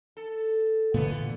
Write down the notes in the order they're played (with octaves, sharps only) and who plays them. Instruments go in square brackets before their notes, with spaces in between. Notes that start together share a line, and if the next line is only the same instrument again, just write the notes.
[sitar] A4
[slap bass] A#2 D3 E3 [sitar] A3 B3